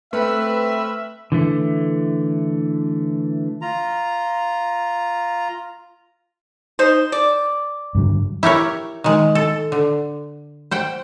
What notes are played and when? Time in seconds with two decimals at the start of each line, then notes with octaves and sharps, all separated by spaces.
0.13 A3 C4 B4 E5 B5 E6 F6
1.32 D3 E3 A3
3.62 F4 A#5
6.79 D#4 C5
7.12 D5
7.95 G2 D3 F#3
8.43 E4 G4 A#4 C#5
9.04 D#3 G#3
9.35 A4
9.72 D3
10.71 C5 F#5 G5